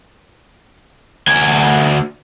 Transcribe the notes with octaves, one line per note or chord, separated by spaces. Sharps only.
D2 G#5